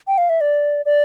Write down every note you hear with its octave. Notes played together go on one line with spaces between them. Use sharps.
G5
F5
E5
D5
D5